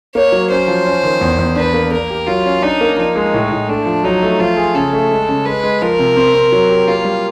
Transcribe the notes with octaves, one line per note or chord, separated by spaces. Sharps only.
A#3 C#5
F#3
C#4 C5
F3
C#4
D#3
E2
E2
D4 B4
A#3
A#3 A#4
G4
F#3 F4
C#4
D4 D#4
A#3
F3 D#4
G#3
A2
A2
A3 D4
F3
F#3 D#4
A3
F3 F4
G#4
C#3 A4
A3
G#3
C#3
G#3 B4
G#3
F3 A#4
C3
C4
C4
F#3
G4
A#3 F4
G3